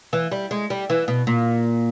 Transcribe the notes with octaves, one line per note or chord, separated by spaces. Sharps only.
E3
G3
G#3
G3
E3
B2
A#2